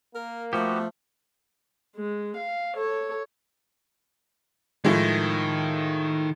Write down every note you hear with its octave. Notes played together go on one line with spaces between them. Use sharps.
A#3 A#4
F3 A3 B3 F#4 G4
G#3
F5
A4 C#5
A2 D#3 F3 G#3